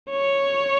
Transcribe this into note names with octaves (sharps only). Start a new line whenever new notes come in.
C#5